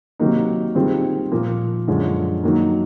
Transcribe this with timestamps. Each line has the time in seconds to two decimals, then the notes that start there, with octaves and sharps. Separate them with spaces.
0.20 C3 D#3 F#3 A#3 D#4
0.75 D#3 G3 C4 F4 G#4
1.32 A#2 F3 A#3
1.87 F#2 D3 F3 G#3 C#4
2.43 D#3 F#3 A#3 D#4